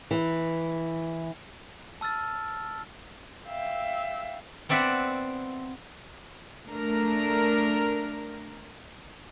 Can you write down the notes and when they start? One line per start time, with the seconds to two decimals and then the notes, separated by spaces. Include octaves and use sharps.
0.11 E3
2.01 A5 E6 F6 A6
3.46 E5 F5 G5
4.69 B3 C4 D5 E5 F#5 B5
6.66 A3 D4 A#4